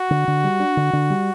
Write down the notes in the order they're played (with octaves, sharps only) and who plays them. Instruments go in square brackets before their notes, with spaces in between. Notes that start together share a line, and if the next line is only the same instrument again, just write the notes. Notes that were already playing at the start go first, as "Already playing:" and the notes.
Already playing: [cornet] F#4
[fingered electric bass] D3
D3
G3
D4
D3
D3
G3